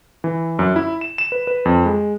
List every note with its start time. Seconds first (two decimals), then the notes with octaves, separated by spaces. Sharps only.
0.24 E3
0.59 F#2
0.76 E4
1.01 E7
1.18 E7
1.32 B4
1.47 B4
1.65 F2
1.86 G#3